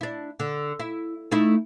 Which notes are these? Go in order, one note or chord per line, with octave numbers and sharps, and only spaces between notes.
D4 E4
D3
E4
A3 D#4 E4